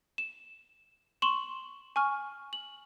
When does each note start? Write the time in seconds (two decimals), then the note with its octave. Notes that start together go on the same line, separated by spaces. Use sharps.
0.18 E7
1.22 C6 C#6 E7 F#7 G7
1.96 G#5 C#6 F6
2.53 F#7